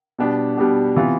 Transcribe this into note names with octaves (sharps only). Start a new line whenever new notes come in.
B2 G3 B3 D4 G4
B2 G3 B3 D4 G4
C3 E3 B3 F4